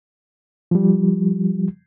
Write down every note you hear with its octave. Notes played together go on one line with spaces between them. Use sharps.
F3 G3